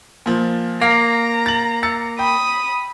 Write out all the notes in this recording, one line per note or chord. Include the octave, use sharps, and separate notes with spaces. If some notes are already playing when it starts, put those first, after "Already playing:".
A#2 F3
A#3 F5 A#5
A6 F#7
E6 A6 C#7
G5 B5 D#6